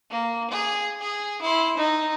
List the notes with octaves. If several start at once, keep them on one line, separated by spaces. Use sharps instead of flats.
A#3
G#4
G#4
E4 C6
D#4